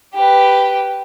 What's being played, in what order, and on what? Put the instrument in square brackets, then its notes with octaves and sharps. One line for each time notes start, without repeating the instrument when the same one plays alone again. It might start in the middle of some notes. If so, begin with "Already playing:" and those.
[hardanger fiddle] G4 B4